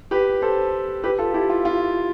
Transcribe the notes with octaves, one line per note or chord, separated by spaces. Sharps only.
G4 B4
A4 C5
G4 B4
F4 A4
E4 G4
F4
F4